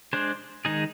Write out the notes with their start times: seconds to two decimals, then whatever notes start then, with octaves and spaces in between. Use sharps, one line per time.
0.13 G#3 D4 G#4 C5
0.65 D#3 G#3 D#4 G#4